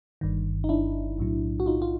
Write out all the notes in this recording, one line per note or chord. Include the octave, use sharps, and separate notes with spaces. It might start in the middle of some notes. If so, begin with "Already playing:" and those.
G1 G2 D#3
D#4
D4 E4
B1 A2 F#3
F#4
D#4 F4
F4